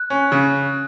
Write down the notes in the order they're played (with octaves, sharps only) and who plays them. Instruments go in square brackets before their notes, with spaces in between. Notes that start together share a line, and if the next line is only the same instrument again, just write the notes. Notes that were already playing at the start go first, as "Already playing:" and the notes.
Already playing: [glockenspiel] F#6
[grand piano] C#4
C#3